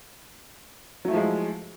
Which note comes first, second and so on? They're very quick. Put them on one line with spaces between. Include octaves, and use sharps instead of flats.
F#3 A3 E4 F3 G#3